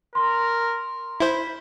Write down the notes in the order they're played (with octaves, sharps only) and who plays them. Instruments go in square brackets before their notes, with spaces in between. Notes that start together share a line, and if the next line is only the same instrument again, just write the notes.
[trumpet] A#4 [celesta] C6
[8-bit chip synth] E4 C5 [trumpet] B5